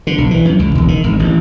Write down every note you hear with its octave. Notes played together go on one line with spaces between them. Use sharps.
D3
B1
E3
F#2
C#2
E1
D#3
G#1
A1